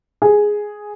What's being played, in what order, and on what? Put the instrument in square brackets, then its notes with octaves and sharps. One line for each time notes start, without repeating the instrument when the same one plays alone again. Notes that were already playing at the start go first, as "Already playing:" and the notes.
[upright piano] G#4